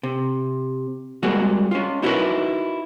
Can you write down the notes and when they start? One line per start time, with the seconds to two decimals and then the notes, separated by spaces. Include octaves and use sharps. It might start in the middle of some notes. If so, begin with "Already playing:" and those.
0.03 C3
1.23 G3 G#3 A#3 C4 F#4 G#4
1.71 C#4 F4
2.02 D#4 E4 F#4 G4 A#4 B4